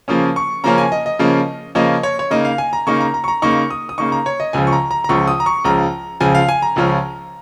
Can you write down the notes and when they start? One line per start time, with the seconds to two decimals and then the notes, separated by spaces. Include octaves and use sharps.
0.08 C#3 F3 A#3 C#4 D#6
0.36 C#6
0.64 C#3 F3 A#3 C#4 A#5
0.78 G#5
0.92 D#5
1.06 D#5
1.19 C#3 F3 A#3 C#4
1.75 C#3 F3 A#3 C#4 D#5
2.03 C#5
2.19 C#5
2.31 C#3 A#3 D#4 D#5
2.45 F5
2.58 G#5
2.73 A#5
2.87 C#3 A#3 D#4 C#6
3.00 A#5
3.14 A#5
3.24 C#6
3.28 A#5
3.42 C#3 A#3 D#4 C#6
3.71 D#6
3.89 D#6
3.98 C#3 A#3 D#4 C#6
4.12 A#5
4.26 C#5
4.40 D#5
4.53 C#2 C#3 F3 G#5
4.67 C#6
4.72 A#5
4.91 A#5
5.04 A#5
5.09 C#2 C#3 F3 C#6
5.28 D#6
5.40 A#5
5.46 C#6
5.65 C#2 C#3 F3 A#5
6.20 C#2 C#3 F3 G#5
6.35 F5
6.49 G#5
6.62 A#5
6.76 C#2 C#3 F3 C#4